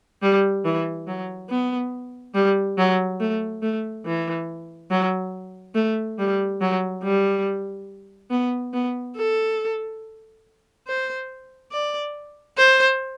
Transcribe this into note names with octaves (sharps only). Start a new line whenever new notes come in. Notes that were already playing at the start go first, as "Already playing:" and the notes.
G3
E3
F#3
B3
G3
F#3
A3
A3
E3
F#3
A3
G3
F#3
G3
B3
B3
A4
C5
D5
C5